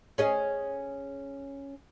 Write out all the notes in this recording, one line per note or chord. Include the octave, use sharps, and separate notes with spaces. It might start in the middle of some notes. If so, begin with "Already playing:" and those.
C#4 G#4 D#5